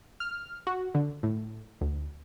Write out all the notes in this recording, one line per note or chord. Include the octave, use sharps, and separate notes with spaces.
F6
F#4
D3
A2
D2